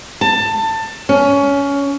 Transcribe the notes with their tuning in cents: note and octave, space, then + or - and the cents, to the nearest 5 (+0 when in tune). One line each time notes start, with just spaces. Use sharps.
A5 +20
C#4 +20